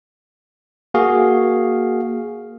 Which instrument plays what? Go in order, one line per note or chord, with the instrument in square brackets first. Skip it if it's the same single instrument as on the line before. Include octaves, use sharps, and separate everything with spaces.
[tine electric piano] A#3 F#4 G#4 F5